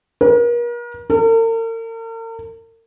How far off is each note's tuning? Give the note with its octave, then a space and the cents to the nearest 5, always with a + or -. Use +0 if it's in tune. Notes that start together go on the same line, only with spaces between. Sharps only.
A#4 +40
A#4 -45